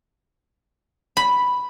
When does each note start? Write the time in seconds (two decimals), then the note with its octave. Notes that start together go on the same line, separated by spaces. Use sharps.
1.17 B5